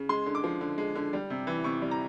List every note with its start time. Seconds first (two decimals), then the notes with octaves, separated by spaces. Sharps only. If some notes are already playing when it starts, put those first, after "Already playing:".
Already playing: C#3
0.09 G#3 C6
0.26 D3
0.35 D6
0.44 F3
0.61 D3
0.78 G#3
0.95 D3
1.13 G3
1.30 C3
1.47 E3
1.64 C3 C#6
1.82 G3
1.91 A#5